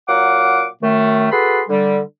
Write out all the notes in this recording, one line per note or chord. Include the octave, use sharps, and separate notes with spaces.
A#2 F#3 F5 F#5 D6
F#2 D#3 A3
F#4 G#4 A4 B4 B5 C6
D3 G3